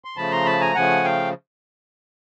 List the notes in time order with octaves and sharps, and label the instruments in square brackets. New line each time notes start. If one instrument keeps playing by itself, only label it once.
[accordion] C6
C#3 F3 A3 A5 B5
A#5 C6
A5 B5
G#5 A#5
C#3 F3 A3 F#5 G#5
F5 G5